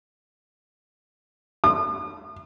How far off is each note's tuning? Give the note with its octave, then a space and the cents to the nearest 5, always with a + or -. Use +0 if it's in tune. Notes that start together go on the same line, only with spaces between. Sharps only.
D#6 -45